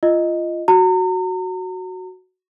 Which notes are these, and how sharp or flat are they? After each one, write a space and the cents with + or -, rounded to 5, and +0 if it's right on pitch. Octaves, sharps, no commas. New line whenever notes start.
F4 -20 D#5 +0
F#4 +0 A#5 -35